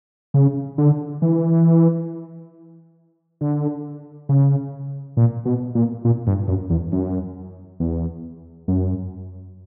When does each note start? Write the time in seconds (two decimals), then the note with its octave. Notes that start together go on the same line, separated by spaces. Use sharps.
0.34 C#3
0.78 D3
1.22 E3
3.41 D3
4.29 C#3
5.17 A#2
5.46 B2
5.75 A#2
6.05 A#2
6.27 G2
6.48 F#2
6.70 E2
6.92 F#2
7.80 E2
8.68 F#2